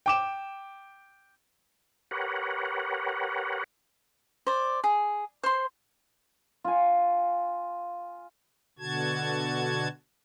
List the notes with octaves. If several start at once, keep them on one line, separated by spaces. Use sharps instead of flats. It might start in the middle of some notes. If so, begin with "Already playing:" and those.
G5 D6 E7
G4 A#4 B4 C#5 F#5
C5 D5
G#4
C5 C6
F4 G#5
B2 D3 F#4 A5 G#6